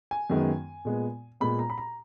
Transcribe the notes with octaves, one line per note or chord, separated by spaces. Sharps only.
G#5
F#2 D#3 G#3 B3
A#2 G#3 B3
A#2 G#3 B3 B5
A#5
B5
A#5